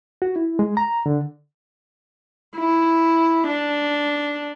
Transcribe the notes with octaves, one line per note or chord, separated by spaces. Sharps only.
F#4
E4
G#3
A#5
D3
E4
D4